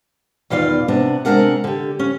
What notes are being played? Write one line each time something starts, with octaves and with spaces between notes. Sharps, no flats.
E2 B2 D#3 F4 D5 F5
C3 B3 D4
C3 E3 G#3 D4 A#4 F#5
D3 G4
C#4